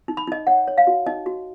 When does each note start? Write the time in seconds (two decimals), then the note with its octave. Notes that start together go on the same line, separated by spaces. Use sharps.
0.08 D#4
0.17 B5
0.27 D#4 D#5
0.47 C#5 F#5
0.67 C#5
0.78 F5
0.87 F#4
1.06 D#4 D#5
1.26 F#4